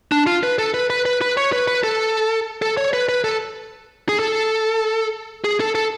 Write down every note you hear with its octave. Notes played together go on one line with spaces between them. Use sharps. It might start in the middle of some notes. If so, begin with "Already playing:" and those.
D4
F4
B4
A4
B4
B4
B4
B4
C#5
B4
B4
A4
A4
C#5
B4
B4
A4
G#4
A4
G#4
A4
A4